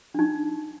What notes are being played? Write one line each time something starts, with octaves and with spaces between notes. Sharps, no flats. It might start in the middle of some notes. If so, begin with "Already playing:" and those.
D4 D#4